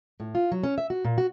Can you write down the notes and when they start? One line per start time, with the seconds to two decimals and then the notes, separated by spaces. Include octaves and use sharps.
0.20 A2
0.35 F4
0.52 F#3
0.63 C#4
0.78 E5
0.90 F#4
1.05 A#2
1.18 F#4